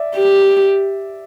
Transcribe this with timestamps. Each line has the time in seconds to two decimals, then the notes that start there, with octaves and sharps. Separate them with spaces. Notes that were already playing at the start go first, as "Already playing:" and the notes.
Already playing: D5 E5
0.15 G4